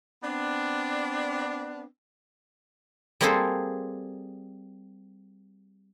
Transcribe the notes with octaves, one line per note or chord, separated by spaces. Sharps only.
B3 C4 D4
G3 A#3 C4 G#4 A4 C5